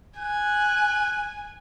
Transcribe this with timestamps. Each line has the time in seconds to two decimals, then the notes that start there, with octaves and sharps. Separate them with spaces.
0.18 G#5 F#6